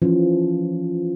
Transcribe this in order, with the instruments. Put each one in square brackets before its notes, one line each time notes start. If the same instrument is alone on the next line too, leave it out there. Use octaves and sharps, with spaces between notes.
[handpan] E3 F3 C#4